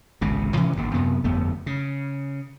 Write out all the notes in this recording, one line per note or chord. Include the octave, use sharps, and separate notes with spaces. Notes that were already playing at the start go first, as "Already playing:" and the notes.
G#1 C#2 C3
C3 E3 F3 C#4
G#1 D#2 D3
F#2 C3 B3
G1 F2 A3 B3
C#3